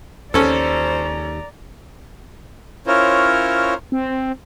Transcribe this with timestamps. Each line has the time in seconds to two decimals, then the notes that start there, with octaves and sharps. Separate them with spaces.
0.34 D#2 C#4 A4 C5 D5 A#5
2.87 C#4 E4 F4 A#4 C5 C#5
3.92 C4